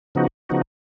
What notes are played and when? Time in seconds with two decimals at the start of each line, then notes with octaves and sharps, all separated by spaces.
0.15 C#3 F3 B3 D#4 F#4
0.49 C#3 F3 B3 D#4 F#4